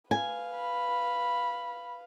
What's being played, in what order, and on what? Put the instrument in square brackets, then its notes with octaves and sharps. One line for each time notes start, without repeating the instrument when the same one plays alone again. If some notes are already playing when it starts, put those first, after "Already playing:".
[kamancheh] B4 F5 [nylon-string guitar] G#5
[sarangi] B5